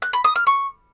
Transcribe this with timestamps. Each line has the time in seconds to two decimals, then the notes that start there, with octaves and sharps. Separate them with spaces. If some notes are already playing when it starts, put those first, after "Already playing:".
0.02 F#6
0.13 B5
0.24 D#6
0.36 F6
0.47 C#6